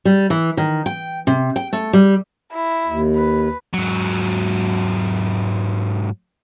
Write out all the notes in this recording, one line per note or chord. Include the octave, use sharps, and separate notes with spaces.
G3
E3
D#3
G5
C3
G5
A3
G3
E4
D#2
B4
G#2 F#3